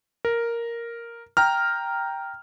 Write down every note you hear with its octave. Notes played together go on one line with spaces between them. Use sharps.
A#4
G5 A#5 F6